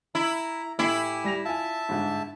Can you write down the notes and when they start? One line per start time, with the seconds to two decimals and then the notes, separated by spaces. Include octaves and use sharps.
0.15 E4 A#5
0.79 A2 E4 G4 G#5 C7
1.24 G3 A#6 F7
1.45 F4 E5 G#5 A5
1.89 G1 G#2